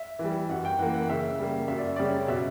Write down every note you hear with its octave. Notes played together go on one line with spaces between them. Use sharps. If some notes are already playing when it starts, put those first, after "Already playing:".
Already playing: E5
E3 G3
F#2 F#5
G5
E3 A#3 F#5
F#5
C#3 E5
G3 A#3
F#2 E5
D5
C#3 G3 C#4 D5
B2 E5